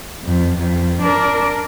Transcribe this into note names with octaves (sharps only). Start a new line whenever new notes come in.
F2
F2
D4 A#4